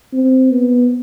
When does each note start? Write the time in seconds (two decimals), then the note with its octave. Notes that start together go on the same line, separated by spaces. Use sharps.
0.13 C4
0.51 B3